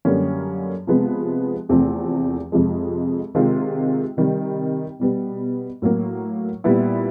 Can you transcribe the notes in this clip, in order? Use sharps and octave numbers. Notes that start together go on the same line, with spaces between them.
F#2 D3 G3 A#3 C#4
C3 F3 G#3 B3
E2 C3 F3 A3 C4
F2 C3 F3 G#3
C3 D#3 G#3 C4 F4
C3 D#3 G3
B2 G3 B3
A2 F#3 A#3
A#2 G3 B3 E4